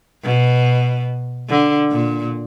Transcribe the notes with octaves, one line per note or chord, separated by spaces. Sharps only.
B2
D3
A#2